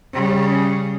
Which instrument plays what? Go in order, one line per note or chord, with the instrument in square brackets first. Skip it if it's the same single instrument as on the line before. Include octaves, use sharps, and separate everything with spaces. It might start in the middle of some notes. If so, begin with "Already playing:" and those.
[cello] C#3 G3